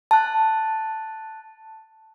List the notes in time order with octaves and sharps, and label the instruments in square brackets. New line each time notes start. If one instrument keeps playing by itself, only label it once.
[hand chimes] A5 F#6